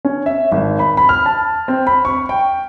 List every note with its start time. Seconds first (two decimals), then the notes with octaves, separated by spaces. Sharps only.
0.05 C#4
0.26 E5
0.52 G#1
0.79 B5
0.97 B5
1.09 F6
1.26 A5
1.68 C4
1.87 B5
2.05 C#6
2.29 G5